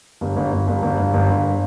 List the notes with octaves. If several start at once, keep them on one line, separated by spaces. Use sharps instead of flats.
G1
G1
G1
G1
G1
G1
G1
G1